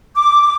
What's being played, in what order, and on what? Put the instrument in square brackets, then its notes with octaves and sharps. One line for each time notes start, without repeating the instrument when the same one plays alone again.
[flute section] D6